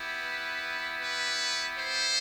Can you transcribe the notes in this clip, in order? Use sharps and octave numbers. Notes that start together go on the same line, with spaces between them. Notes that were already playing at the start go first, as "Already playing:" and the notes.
Already playing: B3 E4 G4
B4
B4
C5